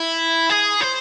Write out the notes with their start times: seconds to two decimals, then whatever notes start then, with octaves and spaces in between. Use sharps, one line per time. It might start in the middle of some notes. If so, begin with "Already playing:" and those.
Already playing: E4
0.50 G#4
0.81 C5